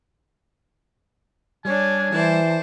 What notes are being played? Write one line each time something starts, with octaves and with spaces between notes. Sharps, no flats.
G3 D4 C#5 G#5
E3 C5 D5 A5